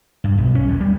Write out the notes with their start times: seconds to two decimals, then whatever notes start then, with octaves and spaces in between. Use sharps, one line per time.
0.24 G2
0.38 B1
0.55 C#4
0.68 D2
0.80 G3